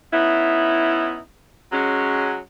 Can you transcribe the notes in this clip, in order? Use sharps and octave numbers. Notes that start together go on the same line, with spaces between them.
B3 C#4 D#4 E4
F#3 G#3 C#4